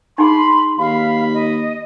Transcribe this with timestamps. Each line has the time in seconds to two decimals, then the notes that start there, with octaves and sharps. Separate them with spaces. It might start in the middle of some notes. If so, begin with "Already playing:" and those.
0.18 D#4 G#4 B5 C6
0.79 D#2 F5 B5
1.33 D#5